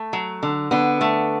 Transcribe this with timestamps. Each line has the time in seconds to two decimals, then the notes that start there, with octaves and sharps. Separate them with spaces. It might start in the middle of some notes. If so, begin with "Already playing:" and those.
Already playing: A3
0.13 F#3
0.43 D3
0.71 D3 B3
1.01 A3